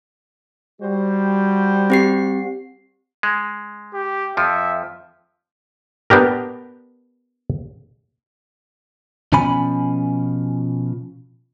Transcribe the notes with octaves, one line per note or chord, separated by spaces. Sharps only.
G3 F#4 C5
C4 G4 C7
G#3
G4
F2 F3 E5
B3 D4 G4 A#4
B2 F3 C#4 G#5 B5